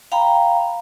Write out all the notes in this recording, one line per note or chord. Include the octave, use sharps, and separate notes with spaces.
F5 G5 A#5 B5